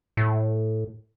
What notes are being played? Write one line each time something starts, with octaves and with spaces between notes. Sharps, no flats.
A2